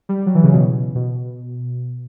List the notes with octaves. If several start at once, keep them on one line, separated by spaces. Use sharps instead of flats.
G3
G3
F#3
E3
C#3
B2
B2